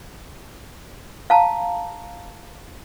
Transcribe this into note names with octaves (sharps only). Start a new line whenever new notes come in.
F5 A5 A#5